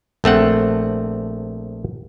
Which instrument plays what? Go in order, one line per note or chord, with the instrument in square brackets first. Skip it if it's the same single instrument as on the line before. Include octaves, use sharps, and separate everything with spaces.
[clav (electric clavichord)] A#1 A3 C4 F#5